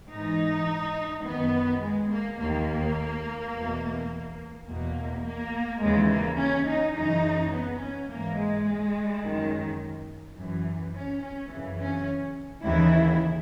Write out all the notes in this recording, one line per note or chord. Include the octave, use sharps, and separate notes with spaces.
G#2 E3 D#4
F#2 D#3 B3
G#3
A#3
D#2 D#3 A#3
E2 B2
E2 B2 A#3
A#3
D#2 C#3 E3 G#3
A#3
C#4
D#4
F#2 C#3 E3 D#4
B3
C#4
G#2 E3 A#3
G#3
F#2 D#3
F#2 E3
C#4
C#4
F#2 C#3 E3
C#4
D#2 C#3 E3 E4